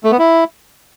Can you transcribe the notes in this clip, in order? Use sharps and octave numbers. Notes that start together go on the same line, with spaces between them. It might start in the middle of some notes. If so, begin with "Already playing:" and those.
A3
B3
E4